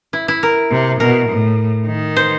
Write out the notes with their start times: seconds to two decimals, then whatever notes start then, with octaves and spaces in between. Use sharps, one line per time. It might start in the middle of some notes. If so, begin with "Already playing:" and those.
0.13 E4
0.28 E4
0.43 A#4
0.71 C3
1.00 B2 A#4
1.30 A2
1.87 D#3
2.16 C5